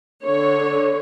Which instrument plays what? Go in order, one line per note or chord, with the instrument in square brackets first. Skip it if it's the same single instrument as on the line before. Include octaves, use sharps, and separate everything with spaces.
[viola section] D3 C#5